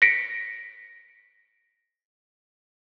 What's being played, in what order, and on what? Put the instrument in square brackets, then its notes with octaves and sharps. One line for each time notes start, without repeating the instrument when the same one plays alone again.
[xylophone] A#6 B6 C#7 D7